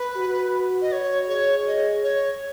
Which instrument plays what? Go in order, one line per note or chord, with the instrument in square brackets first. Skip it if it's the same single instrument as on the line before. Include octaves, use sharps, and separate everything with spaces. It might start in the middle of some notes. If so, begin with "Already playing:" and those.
Already playing: [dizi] B4
[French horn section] F#4
[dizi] D#5
C#5
[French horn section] G#4 [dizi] C#5
[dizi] D#5
C#5